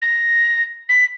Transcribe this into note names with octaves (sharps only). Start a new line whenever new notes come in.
A#6
B6